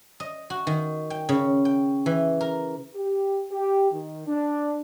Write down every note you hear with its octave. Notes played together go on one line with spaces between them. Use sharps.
D#5
F#4
D#3
G5
C#3
G5
E3
A#4
G4
G4
D#3
D4